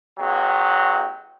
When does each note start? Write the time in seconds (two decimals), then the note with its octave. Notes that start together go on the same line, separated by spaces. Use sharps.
0.19 A1 E2 F#3 G5